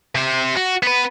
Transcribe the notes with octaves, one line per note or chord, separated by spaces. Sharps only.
C3 C5
F#4
B3 B4